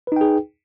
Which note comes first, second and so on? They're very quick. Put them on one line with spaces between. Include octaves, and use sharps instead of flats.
B4 D#4 G5 G#4